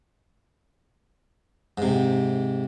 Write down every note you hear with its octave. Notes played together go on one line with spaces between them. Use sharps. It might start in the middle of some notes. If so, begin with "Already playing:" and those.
G#2 C3